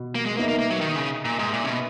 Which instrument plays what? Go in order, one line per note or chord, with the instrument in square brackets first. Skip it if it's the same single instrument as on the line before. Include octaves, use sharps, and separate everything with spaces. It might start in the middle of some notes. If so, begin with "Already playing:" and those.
Already playing: [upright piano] B2
[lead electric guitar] A#3
G#3
[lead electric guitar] A#3 [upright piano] B3 D#4 A#4 E5
[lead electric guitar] A#3
A#3
F#3
D#3
C#3
A#2
G#2
A#2
C#3
B2